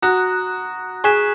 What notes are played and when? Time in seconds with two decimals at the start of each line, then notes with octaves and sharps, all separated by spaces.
0.02 F#4 A#5 D#6 F#6
1.04 G#4 G#5 C#6 F#6 B6 E7